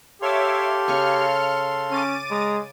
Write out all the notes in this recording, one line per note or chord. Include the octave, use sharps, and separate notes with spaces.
G4 A4 C#5 E5 F5 C6 D6
C#3 G#5 F6 C#7
C#4 D6 A6 D#7
G#3 A#5